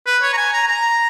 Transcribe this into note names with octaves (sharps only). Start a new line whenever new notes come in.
B4
C#5
A#5
G#5
A#5
A#5